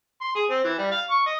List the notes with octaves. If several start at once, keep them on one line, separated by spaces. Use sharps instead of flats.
C6
G#4
C4
E3
G3
F5
C#6
D#5